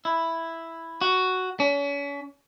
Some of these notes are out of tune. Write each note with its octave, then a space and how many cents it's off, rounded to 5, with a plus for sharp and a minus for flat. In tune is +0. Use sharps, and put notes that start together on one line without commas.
E4 +0
F#4 +5
C#4 +40